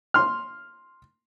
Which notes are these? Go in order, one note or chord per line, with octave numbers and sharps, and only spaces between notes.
C6 F6